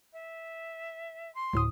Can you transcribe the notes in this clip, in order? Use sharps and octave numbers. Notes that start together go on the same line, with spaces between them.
E5
C6
D2 A2 D#6